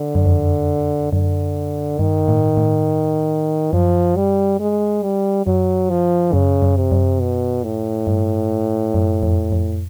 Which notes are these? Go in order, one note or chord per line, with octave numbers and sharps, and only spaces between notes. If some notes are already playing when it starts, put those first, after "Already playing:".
Already playing: D3
F#2
F2
F#2 D3
G2 D#3
A2
A2
F#2 F3
G3
G#3
G3
F#2 F#3
F3
F#2 C#3
F#2
C3
F#2
B2
A2
G2
F#2
F2
F2